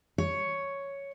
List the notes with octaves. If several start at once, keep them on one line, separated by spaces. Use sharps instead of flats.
C#5